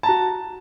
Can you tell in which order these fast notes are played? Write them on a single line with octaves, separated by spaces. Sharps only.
A5 A#5 F#4